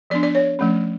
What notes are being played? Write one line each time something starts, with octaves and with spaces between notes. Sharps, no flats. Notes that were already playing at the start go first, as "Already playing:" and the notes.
F3 B3 D4 D5
D5
C#5
F3 A3 C#4